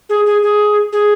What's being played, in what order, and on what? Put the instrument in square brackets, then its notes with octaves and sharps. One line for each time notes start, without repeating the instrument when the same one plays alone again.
[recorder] G#4
G#4
G#4
G#4